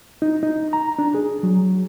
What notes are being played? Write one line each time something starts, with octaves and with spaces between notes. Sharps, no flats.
D#4
D#4
A#5
D4
G#4
F#3